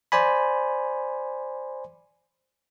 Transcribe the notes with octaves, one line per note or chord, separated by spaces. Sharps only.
C5 D5 G#5 B5